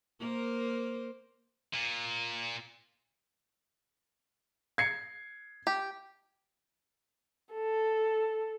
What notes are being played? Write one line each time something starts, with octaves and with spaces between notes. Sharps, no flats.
A#3 A#4 C5
A#2
G#6 C7 C#7
G4
A4